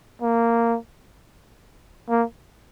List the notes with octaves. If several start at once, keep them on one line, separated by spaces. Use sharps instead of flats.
A#3
A#3